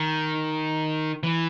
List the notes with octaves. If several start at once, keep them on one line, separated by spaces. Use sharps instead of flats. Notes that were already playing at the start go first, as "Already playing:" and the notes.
Already playing: D#3
E3